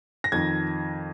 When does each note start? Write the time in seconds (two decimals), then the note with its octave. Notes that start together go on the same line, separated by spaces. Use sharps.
0.24 A#6
0.32 F2 D#3 G#6